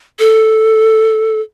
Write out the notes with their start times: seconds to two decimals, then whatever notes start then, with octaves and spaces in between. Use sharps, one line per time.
0.19 A4